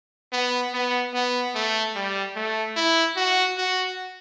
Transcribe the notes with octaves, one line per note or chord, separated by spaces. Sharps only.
B3
B3
B3
A3
G3
A3
E4
F#4
F#4